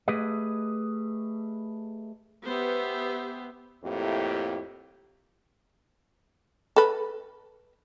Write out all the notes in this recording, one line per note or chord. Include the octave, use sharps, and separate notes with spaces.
A3 G4 G#4 B4 D#5
B3 G4 C5 E5
F2 A2 A#3 E4 G4
A4 B4